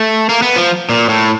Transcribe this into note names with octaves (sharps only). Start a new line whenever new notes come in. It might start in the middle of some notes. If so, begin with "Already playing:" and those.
Already playing: A3
A#3
B3
F3
A#2
A2